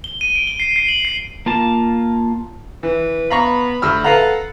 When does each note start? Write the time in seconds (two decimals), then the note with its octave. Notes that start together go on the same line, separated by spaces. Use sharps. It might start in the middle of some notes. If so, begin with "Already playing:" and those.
0.04 G7
0.21 D#7
0.35 D7
0.47 G7
0.60 C7
0.76 C7
0.88 F#7
1.05 C7
1.46 A#3 F4 A5
2.83 E3 B4
3.30 B3 F5 A#5 B5 C#6
3.82 D2 E6 F6
4.04 A4 B4 F5 F#5 A#5